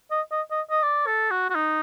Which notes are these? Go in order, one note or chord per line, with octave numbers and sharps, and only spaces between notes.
D#5
D#5
D#5
D#5
D5
A4
F#4
F#4
D#4